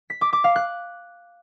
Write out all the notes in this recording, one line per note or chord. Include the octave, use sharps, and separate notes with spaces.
B6
D6
D6
F5
F#6